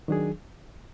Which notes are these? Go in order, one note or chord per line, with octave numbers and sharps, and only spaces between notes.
D#3 F#3 D4 G#4